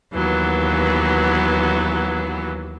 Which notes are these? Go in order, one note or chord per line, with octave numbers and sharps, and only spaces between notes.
D#2 E3 F#3 B3